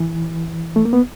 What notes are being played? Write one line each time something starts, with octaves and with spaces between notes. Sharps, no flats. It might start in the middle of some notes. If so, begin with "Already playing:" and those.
Already playing: E3
A3
A#3
B3